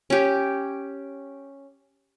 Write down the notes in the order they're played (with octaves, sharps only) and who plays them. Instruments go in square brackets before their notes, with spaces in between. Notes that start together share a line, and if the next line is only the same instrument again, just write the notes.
[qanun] C#4 G4